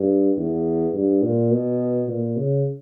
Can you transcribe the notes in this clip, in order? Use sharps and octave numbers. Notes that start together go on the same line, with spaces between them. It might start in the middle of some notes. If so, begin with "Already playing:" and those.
Already playing: G2
E2
G2
A#2
B2
A#2
C#3